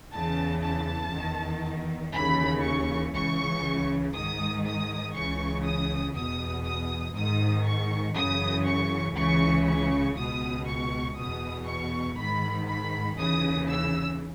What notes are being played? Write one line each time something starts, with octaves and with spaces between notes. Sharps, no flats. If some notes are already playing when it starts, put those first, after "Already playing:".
E2 C#3 E3 A5
A5
E2 D#3
D#2 C#3 E3 B5
C#6
C#2 C#3 E3 C#6
G#2 D#3 D#6
D#6
C#2 C#3 E3 C#6
D#6
E2 B2 D#6
D#6
G#2 D#3 D#6
C#6
F#2 C#3 E3 D#6
C#6
C#2 C#3 E3 C#6
C#6
C#2 B2 D#6
C#6
E2 B2 D#6
C#6
G#2 D#3 B5
B5
D#2 C#3 E3 D#6
E6